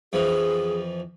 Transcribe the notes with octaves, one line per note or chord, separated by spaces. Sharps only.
F2 E3 F3 G#4